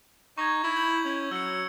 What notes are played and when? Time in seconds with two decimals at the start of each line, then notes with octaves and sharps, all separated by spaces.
0.38 D#4 C#6 G#6
0.64 E4
0.76 G6 F#7
1.05 C#4
1.31 F#3 E6 C#7